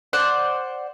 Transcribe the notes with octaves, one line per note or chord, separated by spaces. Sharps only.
C5 D5 F#5